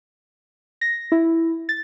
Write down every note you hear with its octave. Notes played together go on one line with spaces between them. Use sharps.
A#6
E4
A6